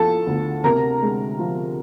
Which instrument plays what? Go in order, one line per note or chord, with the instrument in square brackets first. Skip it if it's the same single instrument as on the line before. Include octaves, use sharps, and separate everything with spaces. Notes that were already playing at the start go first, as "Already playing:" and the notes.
Already playing: [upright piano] F3 A4 A5
D2
C3 A#4 A#5
G#3
F3